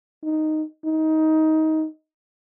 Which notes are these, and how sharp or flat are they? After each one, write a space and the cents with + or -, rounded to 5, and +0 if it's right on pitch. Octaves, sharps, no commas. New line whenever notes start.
D#4 -5
D#4 +15